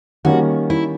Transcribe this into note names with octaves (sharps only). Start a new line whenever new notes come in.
D#3 G3 A#3 C#4 F#4
E4